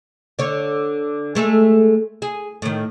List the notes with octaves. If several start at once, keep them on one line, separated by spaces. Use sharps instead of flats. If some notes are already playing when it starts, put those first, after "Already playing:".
D3 C#5
G#3 A3 A4
G#4
A2 D#3